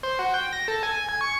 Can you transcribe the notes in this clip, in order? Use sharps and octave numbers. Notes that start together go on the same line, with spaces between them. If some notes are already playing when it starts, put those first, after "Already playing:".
C5
F#4
G5
A#6
A4
G#5
G#6
C#6